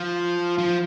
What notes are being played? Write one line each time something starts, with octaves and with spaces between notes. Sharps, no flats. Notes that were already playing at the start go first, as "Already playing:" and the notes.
Already playing: F3
F3